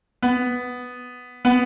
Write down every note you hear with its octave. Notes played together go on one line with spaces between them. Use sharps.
B3
B3